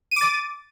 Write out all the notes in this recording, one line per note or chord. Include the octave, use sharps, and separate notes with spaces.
D6 A6 D#7